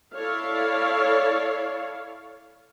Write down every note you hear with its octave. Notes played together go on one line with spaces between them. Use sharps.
E4 A4 C#5 D5 F5